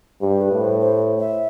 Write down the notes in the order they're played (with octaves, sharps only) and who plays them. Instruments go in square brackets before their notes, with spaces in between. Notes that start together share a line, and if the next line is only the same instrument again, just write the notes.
[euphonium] G2 [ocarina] G4
[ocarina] B4
[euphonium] A2
[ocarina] C5
C5
E5